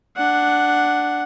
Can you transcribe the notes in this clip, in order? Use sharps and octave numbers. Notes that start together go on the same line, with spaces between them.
D4 F#5